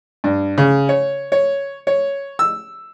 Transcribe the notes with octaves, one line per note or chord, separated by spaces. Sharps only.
G2
C#3
C#5
C#5
C#5
E6